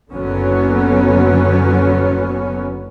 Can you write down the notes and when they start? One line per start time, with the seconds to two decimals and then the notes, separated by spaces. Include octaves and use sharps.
0.12 F#1 D3 F#3 B3 C#4